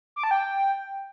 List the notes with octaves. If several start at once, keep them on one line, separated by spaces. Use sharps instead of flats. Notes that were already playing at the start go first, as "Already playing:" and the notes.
D6
A5
G5